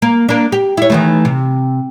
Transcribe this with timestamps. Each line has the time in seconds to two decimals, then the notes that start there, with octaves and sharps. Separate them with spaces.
0.02 A#3
0.29 A#3 D4
0.52 G4
0.77 E4 C#5
0.90 D#3 E3 A3
1.25 C3